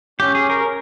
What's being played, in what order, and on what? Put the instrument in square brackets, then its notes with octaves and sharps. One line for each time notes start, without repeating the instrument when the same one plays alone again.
[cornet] C#4 [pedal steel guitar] G4
[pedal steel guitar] G#4
A#4